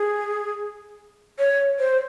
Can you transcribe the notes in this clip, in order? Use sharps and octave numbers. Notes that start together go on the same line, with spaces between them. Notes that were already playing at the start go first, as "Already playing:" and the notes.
Already playing: G#4
C#5
C5